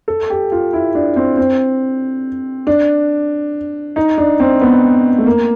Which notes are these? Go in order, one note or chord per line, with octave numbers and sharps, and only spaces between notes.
A4
G4
F4
E4
D4
C4
C4
D4
D#4
D4
C4
B3
A3
A#3